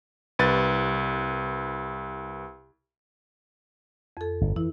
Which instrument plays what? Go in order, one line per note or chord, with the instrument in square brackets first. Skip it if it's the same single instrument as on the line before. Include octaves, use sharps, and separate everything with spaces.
[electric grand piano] C2 B4 A6
[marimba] F2 A4
[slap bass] G1
[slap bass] E3 [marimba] E4